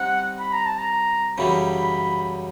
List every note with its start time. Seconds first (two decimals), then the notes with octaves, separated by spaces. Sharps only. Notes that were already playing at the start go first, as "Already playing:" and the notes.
Already playing: G3 C4 D#4 F#5
0.39 B5
0.53 A#5
0.66 A5
0.79 A#5
1.38 F#2 C#3 E3 G3 B5
1.65 B5